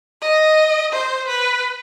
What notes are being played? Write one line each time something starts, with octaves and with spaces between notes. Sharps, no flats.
D#5
C5
B4